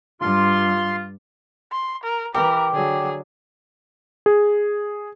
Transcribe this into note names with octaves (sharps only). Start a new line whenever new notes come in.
G2 F4 C6
C6
A#4
E3 G4 A#4
D3 F#3 G#4
G#4